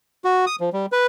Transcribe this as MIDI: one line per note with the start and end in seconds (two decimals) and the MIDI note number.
0.25 0.45 66
0.47 0.56 87
0.60 0.70 53
0.73 0.86 55
0.92 1.07 71